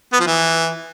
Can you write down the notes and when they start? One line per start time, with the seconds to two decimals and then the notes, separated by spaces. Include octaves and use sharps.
0.13 B3
0.20 F3
0.27 E3